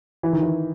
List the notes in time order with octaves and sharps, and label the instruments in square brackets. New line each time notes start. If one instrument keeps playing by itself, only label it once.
[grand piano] E3
D#3
E3